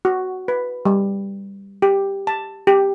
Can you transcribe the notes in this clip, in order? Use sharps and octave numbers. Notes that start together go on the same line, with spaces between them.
F#4
B4
G3
G4
A5
G4